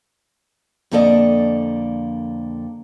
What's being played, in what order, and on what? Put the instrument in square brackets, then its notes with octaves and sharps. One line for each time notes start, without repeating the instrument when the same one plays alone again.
[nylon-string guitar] F2 D3 A#3 A4 D5 D#5